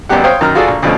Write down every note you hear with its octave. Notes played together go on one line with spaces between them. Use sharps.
G#1 F#2 G3 B3 G4 F#5
C5 C#5 F5 G5 D#6
F#2 D#3 A#5 F6
F4 F#4 G#4 A4 D5
A#1
D2 B2 F3 A3 C#4